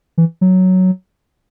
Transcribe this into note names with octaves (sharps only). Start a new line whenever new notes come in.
E3
F#3